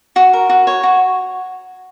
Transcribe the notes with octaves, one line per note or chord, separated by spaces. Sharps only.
F#4
A#4
F#4
C#5
F#4